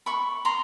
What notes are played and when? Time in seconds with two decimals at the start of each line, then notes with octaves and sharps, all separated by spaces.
0.06 B5 C#6
0.45 A#5 C6